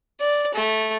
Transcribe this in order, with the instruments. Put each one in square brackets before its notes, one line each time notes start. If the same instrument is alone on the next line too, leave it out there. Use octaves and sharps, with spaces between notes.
[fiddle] D5
A3